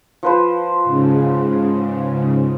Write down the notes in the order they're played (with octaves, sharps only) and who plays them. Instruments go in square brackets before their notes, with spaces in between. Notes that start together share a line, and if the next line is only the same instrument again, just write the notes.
[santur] F3 B4 C5
[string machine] G#2 C#3